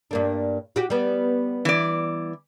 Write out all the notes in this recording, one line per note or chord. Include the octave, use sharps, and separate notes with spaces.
G2 A#3 D4
F#4 G4
G3 B3
E3 D5